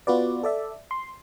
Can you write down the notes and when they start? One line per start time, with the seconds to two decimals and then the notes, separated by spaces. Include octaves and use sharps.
0.07 B3 F4 F#4 B4 D5
0.43 A4 D5 E5
0.91 C6